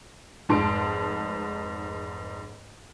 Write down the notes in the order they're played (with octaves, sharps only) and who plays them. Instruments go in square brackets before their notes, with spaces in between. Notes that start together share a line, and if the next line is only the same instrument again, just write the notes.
[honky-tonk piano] F1 G#2 A5 C6 D7